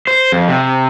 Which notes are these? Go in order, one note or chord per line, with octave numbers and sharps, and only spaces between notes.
C5
F2
C3